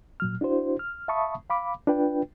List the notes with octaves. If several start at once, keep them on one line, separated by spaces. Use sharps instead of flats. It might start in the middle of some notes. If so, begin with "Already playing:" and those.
A#2 F#3 F6
D4 E4 F#4 C5
F6
E5 F5 A5 B5 C#6 D#6
F5 B5 D6
D4 F4 B4 G5